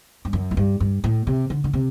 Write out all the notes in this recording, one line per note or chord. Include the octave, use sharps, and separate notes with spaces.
G2
F#2
A2
G2
G2
A2
C3
D3
D3
C3